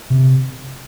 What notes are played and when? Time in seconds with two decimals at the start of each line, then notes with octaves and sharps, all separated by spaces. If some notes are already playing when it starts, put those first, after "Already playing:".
0.10 C3